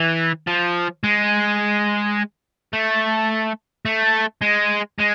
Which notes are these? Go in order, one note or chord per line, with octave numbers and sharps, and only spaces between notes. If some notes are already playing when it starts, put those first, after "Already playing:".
Already playing: E3
F3
G#3
A3
A3
G#3
G#3